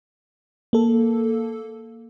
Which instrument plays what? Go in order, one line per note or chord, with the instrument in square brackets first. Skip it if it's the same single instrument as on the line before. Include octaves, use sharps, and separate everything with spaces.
[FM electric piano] A#3 A4